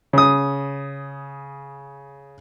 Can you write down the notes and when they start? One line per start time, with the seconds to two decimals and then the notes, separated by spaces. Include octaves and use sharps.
0.13 C#3 D#6